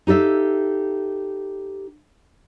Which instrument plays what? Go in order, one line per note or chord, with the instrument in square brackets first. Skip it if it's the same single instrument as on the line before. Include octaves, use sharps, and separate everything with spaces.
[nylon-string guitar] D#4 G4 A4 E5 F5